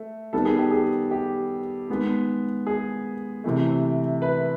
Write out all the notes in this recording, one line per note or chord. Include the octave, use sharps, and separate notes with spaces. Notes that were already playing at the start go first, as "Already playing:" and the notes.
Already playing: A3
D#3 G3 B3 A4
G#4
G4
G#4
G4
D#3 G#3 B3
G#4
C3 E3 A3
B4